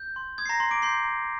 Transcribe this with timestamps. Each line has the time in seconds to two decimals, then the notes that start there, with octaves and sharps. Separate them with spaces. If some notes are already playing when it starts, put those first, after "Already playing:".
Already playing: G6
0.16 C6
0.38 D#6 G#6
0.46 C7
0.49 A#5 A#6
0.60 A#5 C6 C7
0.71 D6 D7
0.82 C6 G6 C7
1.04 A#5